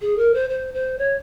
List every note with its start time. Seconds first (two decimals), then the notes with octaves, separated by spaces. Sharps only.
0.01 G#4
0.17 A#4
0.34 C5
0.49 C5
0.74 C5
0.98 C#5